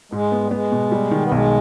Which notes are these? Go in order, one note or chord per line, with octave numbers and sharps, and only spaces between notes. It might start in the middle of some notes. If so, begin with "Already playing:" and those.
G#2 G#3
B3
G3
G#3 B3
B2
G3
D#3
B3
B1 G#3